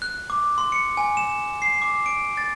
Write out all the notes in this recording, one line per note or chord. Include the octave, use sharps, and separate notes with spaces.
F#6
D6
C6
C#7
G#5
E7
C7
D6
D7
A6